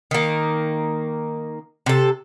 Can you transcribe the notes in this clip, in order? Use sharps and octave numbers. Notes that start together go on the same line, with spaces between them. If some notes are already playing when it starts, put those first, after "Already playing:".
D#3 A#3
C3 A4